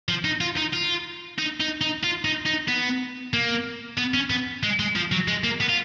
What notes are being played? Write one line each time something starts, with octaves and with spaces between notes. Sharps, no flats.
F3
D#4
F4
D#4
F4
D#4
D#4
D#4
F4
D#4
D#4
B3
A#3
B3
C#4
B3
G#3
G#3
F3
F#3
G#3
A#3
B3
F4